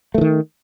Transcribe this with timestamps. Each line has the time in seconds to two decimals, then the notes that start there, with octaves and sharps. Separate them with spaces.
0.14 A3
0.18 E3
0.21 D#3